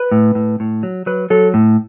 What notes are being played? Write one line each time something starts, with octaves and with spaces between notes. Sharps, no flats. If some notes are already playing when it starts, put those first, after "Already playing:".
Already playing: B4
A2
A2
A2
F#3
F#3 B4
F#3 A4
A2